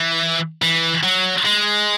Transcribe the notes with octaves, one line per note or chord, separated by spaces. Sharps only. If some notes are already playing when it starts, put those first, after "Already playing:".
Already playing: E3
E3
F#3
G#3